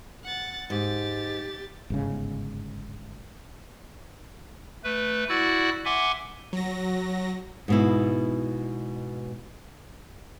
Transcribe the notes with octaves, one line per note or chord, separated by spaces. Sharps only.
F#5 A6
G#2 G4 A6
G1 G#2 C#3
A3 B4
E4 F#4 D5 F#5 E6 F#6
E5 F#5 G#5 C6 D6
F#3 A#6
G#2 B2 E4